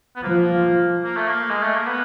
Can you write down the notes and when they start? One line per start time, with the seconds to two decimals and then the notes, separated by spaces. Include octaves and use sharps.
0.16 B3
0.23 F3 A#3
1.04 A#3
1.16 A3
1.28 A#3
1.50 G#3
1.62 A3
1.75 A#3
1.86 B3